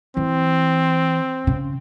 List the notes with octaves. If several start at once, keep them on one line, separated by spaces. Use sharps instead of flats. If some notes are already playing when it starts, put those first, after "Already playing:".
E3 C4
C#3